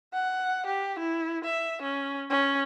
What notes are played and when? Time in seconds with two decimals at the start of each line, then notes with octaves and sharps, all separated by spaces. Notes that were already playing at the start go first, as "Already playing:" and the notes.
0.13 F#5
0.67 G4
0.99 E4
1.45 E5
1.82 C#4
2.30 C#4